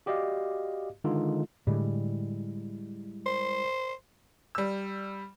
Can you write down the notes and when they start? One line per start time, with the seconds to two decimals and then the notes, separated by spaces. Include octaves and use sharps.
0.06 F#4 G4 D5 D#5 F5
1.04 D3 D#3 G#3 D#4 F4 A4
1.67 A2 D3 G3 G#3 E4
3.26 C5
4.55 G3 E6